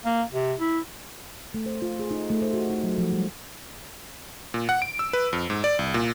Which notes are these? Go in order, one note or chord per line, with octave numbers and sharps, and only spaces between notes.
A#3
C3
E4
A3
C5
F4
G#4
D#4
A3
C5
F#4
D#4
F#3
F3
G3
A#2
F#5
D7
E6
B4
F2
G#2
D5
C2
A#2